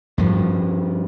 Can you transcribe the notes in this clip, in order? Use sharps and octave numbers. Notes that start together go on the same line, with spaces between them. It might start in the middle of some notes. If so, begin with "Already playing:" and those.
G2 F3